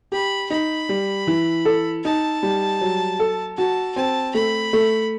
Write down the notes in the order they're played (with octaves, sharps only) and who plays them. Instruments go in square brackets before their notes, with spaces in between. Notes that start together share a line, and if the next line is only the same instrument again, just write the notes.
[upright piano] G4 [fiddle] B5
[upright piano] D#4 [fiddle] B5
[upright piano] G3
E3
A4
[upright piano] D#4 [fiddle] A5
[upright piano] G3
F#3
A4
[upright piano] F#4 [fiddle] A5
[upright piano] C4 [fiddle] A5
[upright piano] A3 [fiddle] B5
[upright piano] A3